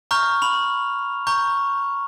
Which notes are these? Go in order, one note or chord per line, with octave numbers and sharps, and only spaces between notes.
A#5 C#6 F6 G6
B5 F7
A#5 C#6 G6